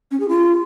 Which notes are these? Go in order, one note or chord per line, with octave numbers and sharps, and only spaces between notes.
C#4
G#4
F4